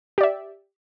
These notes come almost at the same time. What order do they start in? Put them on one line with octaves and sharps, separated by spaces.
G4 D5 E5